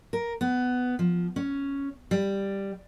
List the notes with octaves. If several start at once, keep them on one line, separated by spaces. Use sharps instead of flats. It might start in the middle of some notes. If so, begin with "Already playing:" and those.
A#4
B3
F3
C#4
G3